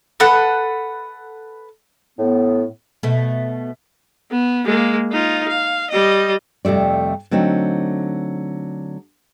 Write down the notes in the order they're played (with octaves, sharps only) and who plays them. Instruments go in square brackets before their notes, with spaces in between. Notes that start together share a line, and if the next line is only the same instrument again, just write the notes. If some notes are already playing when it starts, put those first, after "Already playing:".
[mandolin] A4 B4 F#5
[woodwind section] A2 B3
[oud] B2 A3
[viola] B3
G#3 A#3
D#4 F4
F5
G3 D#5
[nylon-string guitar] F2 C3 G3 A3 D5
D3 F#3 A3 C4 D#4